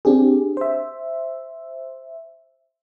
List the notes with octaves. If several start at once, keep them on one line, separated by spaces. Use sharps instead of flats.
C4 D4 G4 G#4
C5 E5